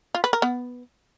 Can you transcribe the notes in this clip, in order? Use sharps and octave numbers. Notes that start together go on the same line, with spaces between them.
F4
B4
A#4
B3